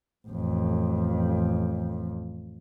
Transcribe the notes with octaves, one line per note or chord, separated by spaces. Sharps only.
A1 F2